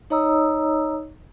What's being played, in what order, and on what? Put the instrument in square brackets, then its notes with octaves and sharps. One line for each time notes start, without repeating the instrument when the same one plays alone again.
[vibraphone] D#4 C#5 D#5 A#5 D#6 E6